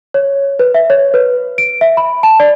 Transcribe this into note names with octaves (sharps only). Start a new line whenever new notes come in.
C#5
B4
E5
C#5
B4
D7
E5
B5
A5
D5